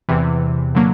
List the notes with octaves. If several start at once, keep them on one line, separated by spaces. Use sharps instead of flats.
E2 C3 E3
D3 F#3 A#3